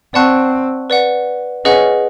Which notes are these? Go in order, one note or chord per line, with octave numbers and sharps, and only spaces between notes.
C4 D5 F#5 A5 C#6 F#6
B4 D5 F#5
C#4 G#4 B4 D#5 F#5